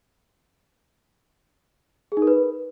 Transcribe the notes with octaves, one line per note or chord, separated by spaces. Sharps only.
G#4
D#4
A#4
B4